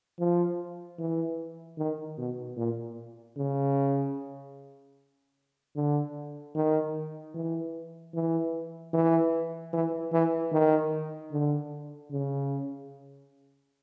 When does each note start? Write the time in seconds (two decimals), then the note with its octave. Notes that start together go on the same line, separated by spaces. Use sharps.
0.19 F3
0.99 E3
1.78 D#3
2.18 B2
2.57 A#2
3.37 C#3
5.76 D3
6.55 D#3
7.34 E3
8.14 E3
8.93 E3
9.73 E3
10.12 E3
10.52 D#3
11.31 D3
12.11 C#3